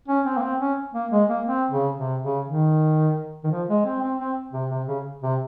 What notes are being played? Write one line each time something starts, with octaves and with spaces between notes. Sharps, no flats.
C#4
C4
A#3
C4
C#4
A#3
G#3
A#3
C4
C#3
C3
C#3
D#3
D#3
F3
G#3
C4
C4
C4
C3
C3
C#3
C3